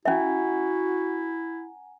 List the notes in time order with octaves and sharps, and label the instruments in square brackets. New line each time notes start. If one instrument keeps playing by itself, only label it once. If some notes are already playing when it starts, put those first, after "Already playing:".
[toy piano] C#4 E5 [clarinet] E4 [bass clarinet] F#4 [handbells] F#5 G#5 A#5